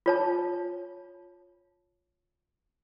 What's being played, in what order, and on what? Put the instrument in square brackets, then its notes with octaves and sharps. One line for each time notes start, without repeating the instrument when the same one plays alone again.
[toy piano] F4 C#5 A5